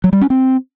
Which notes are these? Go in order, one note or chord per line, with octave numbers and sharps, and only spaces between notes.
F#3
G3
C#4
C4